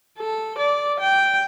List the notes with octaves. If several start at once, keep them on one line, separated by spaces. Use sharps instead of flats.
A4
D5
G5